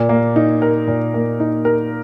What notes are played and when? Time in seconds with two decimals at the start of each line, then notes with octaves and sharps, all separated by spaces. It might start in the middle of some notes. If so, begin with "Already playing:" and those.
Already playing: A#2
0.09 A#3
0.36 D#4
0.62 A#4
0.88 A#2
1.14 A#3
1.40 D#4
1.65 A#4